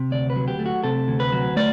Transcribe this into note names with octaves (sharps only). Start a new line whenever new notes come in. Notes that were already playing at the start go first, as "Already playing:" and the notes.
Already playing: C3
D2 D5
B4
F#3
G4
A3
F#4
C3 A4
D2
B4
F#3
A3 D5